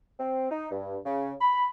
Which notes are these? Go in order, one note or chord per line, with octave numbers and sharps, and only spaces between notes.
C4
D#4
G2
C#3
B5